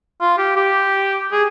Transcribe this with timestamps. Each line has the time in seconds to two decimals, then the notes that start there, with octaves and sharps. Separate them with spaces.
0.21 F4
0.38 G4
0.56 G4
1.32 G#4